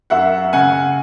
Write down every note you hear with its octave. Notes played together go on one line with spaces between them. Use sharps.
F#2 E5 F#5
C#3 F#5 G#5